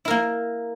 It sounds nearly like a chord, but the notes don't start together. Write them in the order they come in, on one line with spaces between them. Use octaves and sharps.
E4 A#4 A#3